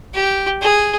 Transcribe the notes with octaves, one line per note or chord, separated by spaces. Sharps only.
G4
G#4